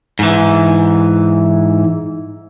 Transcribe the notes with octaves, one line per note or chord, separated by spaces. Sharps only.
G#2 E3